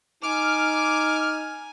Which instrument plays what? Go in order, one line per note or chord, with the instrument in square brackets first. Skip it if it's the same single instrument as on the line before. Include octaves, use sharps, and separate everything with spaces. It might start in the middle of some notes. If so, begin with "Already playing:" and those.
[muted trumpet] D#4 [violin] G#5 [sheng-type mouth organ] D6 [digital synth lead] F6